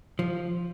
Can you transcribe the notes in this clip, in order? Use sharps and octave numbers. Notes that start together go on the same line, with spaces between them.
F3